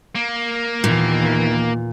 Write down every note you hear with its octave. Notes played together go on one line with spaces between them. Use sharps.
A#3
D#2 A#2 D#3 E3 B3